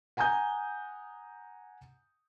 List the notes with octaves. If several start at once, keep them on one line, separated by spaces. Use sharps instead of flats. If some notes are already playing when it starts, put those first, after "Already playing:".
F#5 G#5 A#5 D#6 G6